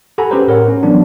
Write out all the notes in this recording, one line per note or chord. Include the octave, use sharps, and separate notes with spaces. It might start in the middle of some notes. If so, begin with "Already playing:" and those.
G4 A4 F#5 G#5 A#5 B5
C#4 G4 G#4 B4 C5
A2 A#4 C#5 F#5
C#4
E3 F#3 B3 D4